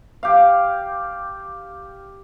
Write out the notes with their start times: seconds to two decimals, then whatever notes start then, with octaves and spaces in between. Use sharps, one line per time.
0.23 G4 F5